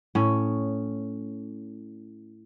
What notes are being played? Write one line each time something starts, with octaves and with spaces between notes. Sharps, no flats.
A2 C#4